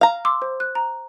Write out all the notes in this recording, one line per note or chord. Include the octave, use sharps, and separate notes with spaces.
F5 A#5
C6 D6 E6
C5
F#6
A#5